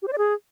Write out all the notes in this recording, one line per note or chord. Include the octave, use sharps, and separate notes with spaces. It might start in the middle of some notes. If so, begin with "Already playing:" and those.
G4
C5
D5
G#4